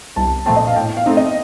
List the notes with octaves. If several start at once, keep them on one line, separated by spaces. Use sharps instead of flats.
C2 A5
A#2 F3 A3 C4 A5
D#5
F5
A2 G5
F5
A3 C4 D#4
D#5